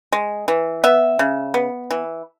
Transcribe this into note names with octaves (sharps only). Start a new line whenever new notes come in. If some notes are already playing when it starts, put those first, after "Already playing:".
G#3
E3
B3 E5
C#3
B3
E3